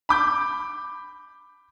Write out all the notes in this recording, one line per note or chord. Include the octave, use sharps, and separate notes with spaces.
B5 D6 G6